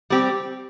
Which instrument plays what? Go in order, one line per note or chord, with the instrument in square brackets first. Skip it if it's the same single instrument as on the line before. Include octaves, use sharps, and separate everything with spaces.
[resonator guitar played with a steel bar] G3 C4 G4